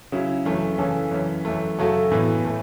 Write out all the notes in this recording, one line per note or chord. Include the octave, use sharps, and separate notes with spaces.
C#3 F#3 C#4 E4
F#2 E3 A3 C#4
C#3 E3 C#4 A4
F#2 E3 C#4
F#2 E3 A3
F#2 C#3 A3 F#4 A4
A2 E3 B3
A2 A3